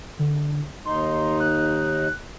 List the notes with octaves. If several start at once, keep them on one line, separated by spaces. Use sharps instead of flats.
D3
D#2 D#4 C6
F#6